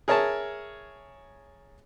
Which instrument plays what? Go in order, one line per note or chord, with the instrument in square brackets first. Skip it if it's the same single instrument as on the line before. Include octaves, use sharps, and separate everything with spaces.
[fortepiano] G#4 A#4 C#5 E5 A5